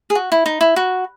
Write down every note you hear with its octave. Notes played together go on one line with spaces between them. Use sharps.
G#4
F#4
E4
D#4
E4
F#4